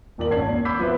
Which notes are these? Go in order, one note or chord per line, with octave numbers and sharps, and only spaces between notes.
D#1 A#2 D#3 D5 F#7
G#1 C#4 A5 G#6 C7
D#2
B5 D6 E6 G6 B6
F3 B3 B4 C5 E5